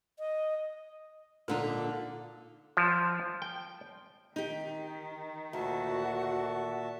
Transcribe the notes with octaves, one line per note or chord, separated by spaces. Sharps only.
D#5
A#2 D3 D#4
F3
G5
D#3 D#4 G4
D2 A#2 F#4 E5 A5